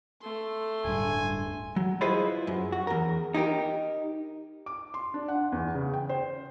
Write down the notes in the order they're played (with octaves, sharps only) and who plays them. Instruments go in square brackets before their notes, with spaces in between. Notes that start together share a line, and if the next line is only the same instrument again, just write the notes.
[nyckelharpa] A3 C6
[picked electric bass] D1 G2 [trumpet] G#5
[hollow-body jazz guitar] F#3
E4 F4 G#4 B4 C5 D#5
F#2
F#4
E2 A#4
D#4 E4 G4 A#4
[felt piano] D6
C6
D4
F#5
E2
C#3
G5
C5